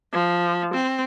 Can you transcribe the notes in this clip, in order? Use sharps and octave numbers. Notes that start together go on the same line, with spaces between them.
F3
C4